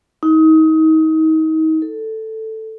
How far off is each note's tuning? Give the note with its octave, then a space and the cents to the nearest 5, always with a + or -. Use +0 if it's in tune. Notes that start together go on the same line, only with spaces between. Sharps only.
D#4 +30
A4 +5